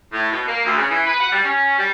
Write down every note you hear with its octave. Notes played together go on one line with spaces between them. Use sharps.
A2
B2
A#3
D2
C#3
E3
B4
F#5
G3
C#4
G3